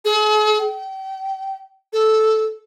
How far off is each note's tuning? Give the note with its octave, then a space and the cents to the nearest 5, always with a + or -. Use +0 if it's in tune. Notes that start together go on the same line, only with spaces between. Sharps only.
G#4 +45
G5 -30
A4 -5